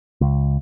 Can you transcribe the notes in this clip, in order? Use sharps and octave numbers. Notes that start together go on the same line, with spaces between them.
C#2